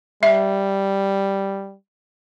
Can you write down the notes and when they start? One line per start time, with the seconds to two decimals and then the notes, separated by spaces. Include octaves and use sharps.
0.23 G3 E5